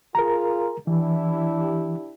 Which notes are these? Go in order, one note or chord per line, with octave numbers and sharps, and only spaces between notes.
F4 G#4 A#4 A#5
E3 D4 E4 G4